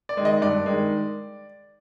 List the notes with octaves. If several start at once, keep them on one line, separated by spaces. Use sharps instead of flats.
D5
D#3 G#3
D#5
G2 D5
D#3 G#3